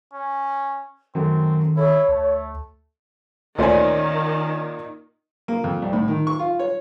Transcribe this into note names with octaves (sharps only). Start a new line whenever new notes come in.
C#4
F#2 D#3 F#3 A3 C4
E4 A4 C#5
D2 A3
D2 A#2 D#3 C#4 C5 D5 G#5
A#3
F2
C2
A2
D#3
C#6
F4
C#5